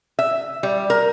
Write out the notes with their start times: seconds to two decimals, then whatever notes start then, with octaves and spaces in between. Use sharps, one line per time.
0.19 E5
0.63 G3
0.90 A#4